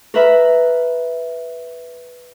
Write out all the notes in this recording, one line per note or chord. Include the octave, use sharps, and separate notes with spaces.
A#4 B4 E5 B5